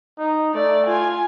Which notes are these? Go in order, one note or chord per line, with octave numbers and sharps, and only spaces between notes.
D#4
A3 D5
F4 G#5